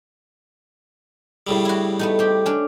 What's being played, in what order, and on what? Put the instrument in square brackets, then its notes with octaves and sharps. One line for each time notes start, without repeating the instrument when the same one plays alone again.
[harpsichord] A2 C#3 G3
[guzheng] E4 F#4
A3 B3 D#4
C4 G4
C#4 D4